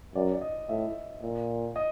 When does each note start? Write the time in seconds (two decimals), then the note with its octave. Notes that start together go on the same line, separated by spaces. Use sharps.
0.15 F#2 D5
0.32 D5
0.41 D#5
0.69 A2 E5
1.22 A#2
1.76 D#5